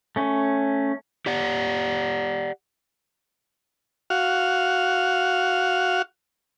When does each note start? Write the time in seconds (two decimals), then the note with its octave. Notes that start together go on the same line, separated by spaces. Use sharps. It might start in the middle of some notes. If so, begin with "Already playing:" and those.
0.16 A3 C#4
1.26 G4 D5 F#5
4.10 F#4 F5